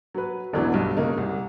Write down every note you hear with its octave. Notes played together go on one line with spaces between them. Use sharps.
F#3 B4
E1 A1 B2 E3 F#3 D4
B1 G2
C#3 G#3 A#3 C#4 D#4
C2